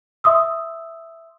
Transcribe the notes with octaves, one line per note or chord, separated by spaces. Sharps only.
E5 C6 D#6 E6